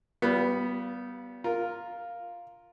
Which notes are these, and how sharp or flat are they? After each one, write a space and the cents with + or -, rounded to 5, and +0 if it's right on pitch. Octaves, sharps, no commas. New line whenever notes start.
G3 -25 B3 +0 F4 -5
F4 +0 A#4 -5